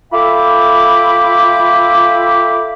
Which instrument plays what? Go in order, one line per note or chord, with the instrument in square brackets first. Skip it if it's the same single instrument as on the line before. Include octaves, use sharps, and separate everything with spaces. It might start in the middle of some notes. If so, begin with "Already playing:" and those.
[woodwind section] F4 A4 E5 G5 B5 D6